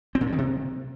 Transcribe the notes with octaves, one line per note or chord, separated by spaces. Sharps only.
C4
A#2
G2
D#3
C3